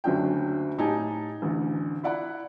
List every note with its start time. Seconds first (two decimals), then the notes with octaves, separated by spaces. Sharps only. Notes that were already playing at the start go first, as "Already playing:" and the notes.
0.04 F#1 D2 F#3 C#4 D4 G5
0.78 A2 D#4 G4 G#5 A5
1.42 A1 D2
2.04 E4 D5 F#5 B5